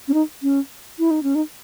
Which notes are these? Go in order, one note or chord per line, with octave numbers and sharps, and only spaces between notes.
C#4
D#4
C#4
E4
D#4
C#4
D#4